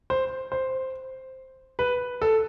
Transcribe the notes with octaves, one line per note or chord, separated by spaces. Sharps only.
C5
C5
B4
A4